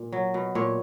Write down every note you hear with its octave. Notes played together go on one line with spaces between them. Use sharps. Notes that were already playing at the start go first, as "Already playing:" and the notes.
Already playing: A#2
F#3
B2
A#2 C#5